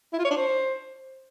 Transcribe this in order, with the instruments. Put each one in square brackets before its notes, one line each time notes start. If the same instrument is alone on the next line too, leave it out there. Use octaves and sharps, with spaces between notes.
[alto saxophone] E4
F4
C#5
D4
C5